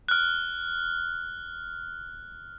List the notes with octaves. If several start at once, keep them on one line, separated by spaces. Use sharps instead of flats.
F6 F#6